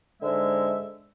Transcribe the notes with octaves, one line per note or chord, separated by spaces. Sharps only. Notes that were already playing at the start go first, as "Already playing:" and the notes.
G#2 D3 G#3 E5